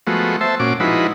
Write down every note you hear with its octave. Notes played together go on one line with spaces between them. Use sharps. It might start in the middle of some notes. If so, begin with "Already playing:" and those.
F3 G#3 A3 B3 F#4
C5 E5 A5
A#2 C#4 F#4 D6
F3 G#3 D#4 E4 F#4 B4